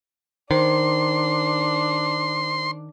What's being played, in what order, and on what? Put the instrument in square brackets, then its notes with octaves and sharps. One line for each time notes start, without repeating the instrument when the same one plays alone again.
[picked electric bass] D#3 [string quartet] D4 [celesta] C5 [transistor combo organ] C6